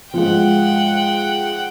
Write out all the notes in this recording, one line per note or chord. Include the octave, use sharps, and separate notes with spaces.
G#2 F3 F#5 G5